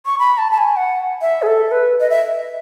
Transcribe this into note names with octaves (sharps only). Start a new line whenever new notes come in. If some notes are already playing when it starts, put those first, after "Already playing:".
C#6
B5
A5
A5
G#5
F#5
E5
G#4
A4
B4
D#5
E5